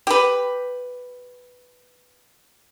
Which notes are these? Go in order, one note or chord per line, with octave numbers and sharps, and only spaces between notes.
G4 B4